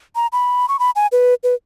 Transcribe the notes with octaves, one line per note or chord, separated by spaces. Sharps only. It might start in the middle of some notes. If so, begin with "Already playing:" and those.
A#5
B5
C#6
B5
G#5
B4
B4